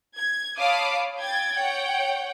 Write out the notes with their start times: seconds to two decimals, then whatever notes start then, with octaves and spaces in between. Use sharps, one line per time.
0.16 G#6
0.57 C#5 F5 A5 B5 D6 D#6
1.19 G5 G#6 A6
1.54 C#5 F#5 G5